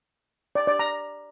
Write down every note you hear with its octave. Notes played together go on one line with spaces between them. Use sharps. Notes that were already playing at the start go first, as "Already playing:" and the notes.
D5
D5
A#5